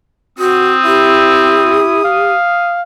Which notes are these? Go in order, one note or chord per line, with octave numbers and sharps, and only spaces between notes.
C4 F#4 D#6
E4 G4
F5